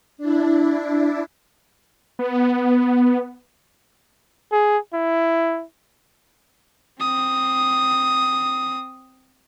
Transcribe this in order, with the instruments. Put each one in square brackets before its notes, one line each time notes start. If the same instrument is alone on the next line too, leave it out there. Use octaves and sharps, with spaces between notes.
[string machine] D4 E4
[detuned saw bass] B3
[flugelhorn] G#4
E4
[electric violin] C4 D#6